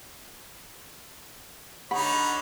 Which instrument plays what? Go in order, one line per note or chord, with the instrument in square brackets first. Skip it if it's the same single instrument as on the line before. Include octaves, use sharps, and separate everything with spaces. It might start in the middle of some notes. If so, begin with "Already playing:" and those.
[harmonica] D3 D#4 C#5 [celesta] F#5 [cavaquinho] B5